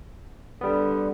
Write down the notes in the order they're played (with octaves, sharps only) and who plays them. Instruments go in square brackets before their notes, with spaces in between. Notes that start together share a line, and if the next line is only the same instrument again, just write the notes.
[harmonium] D3 [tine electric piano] G3 B3